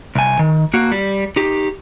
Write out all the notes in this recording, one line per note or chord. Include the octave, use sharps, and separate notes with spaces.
C2 G#5
D#3
A#3 F#4
G3
D#4 G4